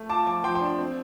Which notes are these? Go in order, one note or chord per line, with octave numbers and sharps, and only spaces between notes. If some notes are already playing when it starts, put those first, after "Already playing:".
Already playing: A3
F4 A5 D6
F3 A5 D6
F3 G5 C6
G5 C6
D4
C4